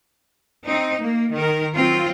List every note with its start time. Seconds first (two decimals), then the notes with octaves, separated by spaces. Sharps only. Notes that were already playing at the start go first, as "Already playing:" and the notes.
0.66 C4 D#4
1.01 A#3
1.33 D#3 A#4
1.76 F#3 C4 F4